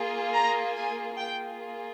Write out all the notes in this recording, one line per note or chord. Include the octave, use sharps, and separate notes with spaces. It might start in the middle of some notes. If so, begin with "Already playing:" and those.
Already playing: A#3 F4 G#4
A#5
G#5
A#3 F4 G#4 G5